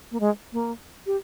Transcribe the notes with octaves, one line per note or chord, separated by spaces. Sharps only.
A#3
G#3
A#3
G4